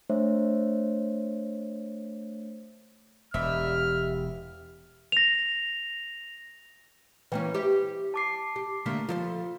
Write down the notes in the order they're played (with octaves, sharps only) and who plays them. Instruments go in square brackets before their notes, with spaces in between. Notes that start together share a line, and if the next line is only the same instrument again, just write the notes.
[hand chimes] A3 D4 C5 C#5 E5
[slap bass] E1 [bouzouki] G3 G4 D#5 [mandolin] E5 [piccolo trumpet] F6
[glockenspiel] A#6 F7
[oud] E3 A#3 C#4 [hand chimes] B4 G5
[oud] G4 C5 E5
[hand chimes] A5 D6 C7
[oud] G4
[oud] D3 A3 A#3 [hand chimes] B6
[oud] F3 A4 C5 [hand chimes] F4